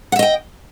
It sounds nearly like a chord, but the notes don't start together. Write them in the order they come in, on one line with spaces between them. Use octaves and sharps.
F#5 E5 D#5 G5